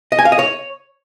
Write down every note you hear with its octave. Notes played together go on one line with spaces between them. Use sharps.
D#5
G#5
F5
D#5
C#5